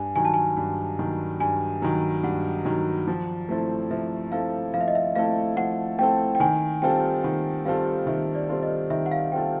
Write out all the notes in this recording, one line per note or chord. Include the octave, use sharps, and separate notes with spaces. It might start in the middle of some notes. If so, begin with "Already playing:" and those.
Already playing: G2 G#5
D#3 F#3 G#5
A5
G#5
G2
D#3 F#3
G2 G#5
D#3 F#3
G2 F#5
D#3 F#3
F3
A3 C4 E4 A4
F3 E5
A3 C4 E4 A4 F5
F3 F5
E5
D#5
E5
A3 C4 E4 A4 F5
F3 F#5
A3 C4 E4 A4 G5
G5
D#3 G#5
G3 C4 F4 A4 G5
D#3 F#5
G3 C4 F4 A4 F5
D#3 E5
D5
G3 C4 F4 A4
D#5
D#3 E5
F#5
F5
G3 C4 F4 A4 G5